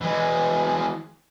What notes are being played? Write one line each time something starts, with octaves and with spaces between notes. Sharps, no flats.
E3 G#3